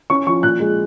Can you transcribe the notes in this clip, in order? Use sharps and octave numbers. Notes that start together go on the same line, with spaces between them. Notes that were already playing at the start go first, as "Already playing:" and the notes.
C#4 C#6
F3 C#6
A#2 F#6
G#3